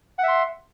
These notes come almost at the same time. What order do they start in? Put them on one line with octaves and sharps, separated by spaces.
F#5 E5 C6